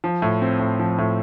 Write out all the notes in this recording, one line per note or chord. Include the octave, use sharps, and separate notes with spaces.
F3
A2
C4
A2
F3
A2